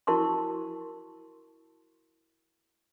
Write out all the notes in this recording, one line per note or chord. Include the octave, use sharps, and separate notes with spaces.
E4 F#4 A#4 A5 C6 C#6